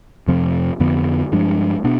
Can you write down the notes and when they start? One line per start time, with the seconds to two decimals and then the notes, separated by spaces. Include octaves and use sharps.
0.28 F2 C3 F3 C4
0.80 F2 D3 F3 B3
1.32 G2 F3 G#3 D4
1.84 B2 B3 D4